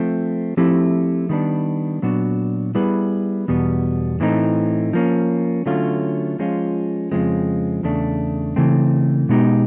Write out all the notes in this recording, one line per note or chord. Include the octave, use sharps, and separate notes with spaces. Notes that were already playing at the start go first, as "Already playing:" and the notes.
Already playing: F3 A3 C4
F3 A3 C4 E4 G4
D#3 G3 B3 D4
A#2 F#3 B3 D4 F#4
G3 B3 E4 G#4 B4
E2 B2 G3 B3
A2 E3 A3 C4 D#4
F3 A#3 C#4
D3 F#3 A3 C#4 F4
F3 G#3 C#4 F4
F2 C#3 F3 G#3 C4
E2 C#3 A3 D4
C#3 E3 A3 C4
B2 G#3 B3 D#4 G4